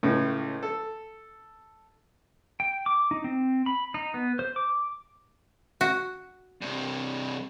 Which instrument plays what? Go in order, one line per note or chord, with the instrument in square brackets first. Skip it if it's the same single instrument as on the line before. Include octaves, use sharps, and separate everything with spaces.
[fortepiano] C#2 A2
A4
[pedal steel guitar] G5
D6
D#4
C4
B5
D#4
B3
C5
D6
[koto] F#4
[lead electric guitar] G2 C3